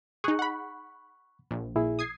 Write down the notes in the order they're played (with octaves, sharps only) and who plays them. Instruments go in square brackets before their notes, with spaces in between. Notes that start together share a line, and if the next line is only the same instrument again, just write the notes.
[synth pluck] D#4 G#4 [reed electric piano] C#6 F#6
[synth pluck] F#5 B5
A#1
[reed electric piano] A#2 E4 G#4
[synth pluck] D#6 G#6 C7